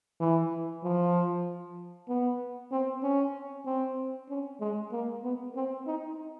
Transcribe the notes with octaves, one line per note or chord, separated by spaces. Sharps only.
E3
F3
B3
C4
C#4
C4
C#4
G#3
A#3
B3
C4
D#4